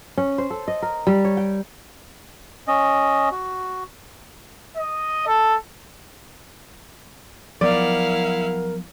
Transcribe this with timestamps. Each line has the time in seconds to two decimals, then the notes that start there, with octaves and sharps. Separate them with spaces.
0.17 C#4
0.38 C5
0.50 A4
0.68 D#5
0.82 A#4
1.07 G3
1.25 C#5
1.37 G5
2.68 C#4 D#5
3.31 F#4
4.77 D#5
5.27 A4
7.61 F3 F#3 B3 E4 A#4 D5 F5 F#5